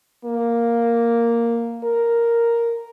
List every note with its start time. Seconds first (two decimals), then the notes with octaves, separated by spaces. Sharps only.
0.25 A#3
1.84 A#4